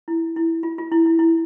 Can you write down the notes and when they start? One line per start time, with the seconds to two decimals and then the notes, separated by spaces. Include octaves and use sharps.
0.08 E4
0.36 E4
0.63 F4
0.78 F4
0.92 E4
1.06 E4
1.19 E4